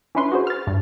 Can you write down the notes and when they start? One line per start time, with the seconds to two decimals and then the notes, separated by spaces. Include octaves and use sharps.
0.15 C#4 D4 E4 B4 C6
0.32 F#4 G#4 C5
0.47 F6 A6
0.67 G2